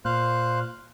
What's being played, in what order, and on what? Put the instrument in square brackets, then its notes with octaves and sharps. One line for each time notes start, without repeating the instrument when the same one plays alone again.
[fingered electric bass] A#2 [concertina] C5 F5 F#6